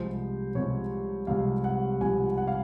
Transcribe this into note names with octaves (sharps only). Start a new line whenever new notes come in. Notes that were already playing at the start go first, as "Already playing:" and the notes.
Already playing: C2 C3 F3 G#3 C5
C2 C3 F3 G#3 C#5
C2 C3 F3 G#3 F5
F#5
C2 C3 F3 G#3 G#5
F#5
F5